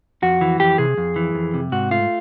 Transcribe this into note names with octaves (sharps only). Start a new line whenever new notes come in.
F2 F#4
E3
F2 G4
C3 G#4
F2
E3
F2
C3
G#2 F#4
A3 F4